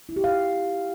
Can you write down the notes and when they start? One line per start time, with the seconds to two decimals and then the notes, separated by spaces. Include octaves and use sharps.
0.09 E4
0.16 G4
0.24 F5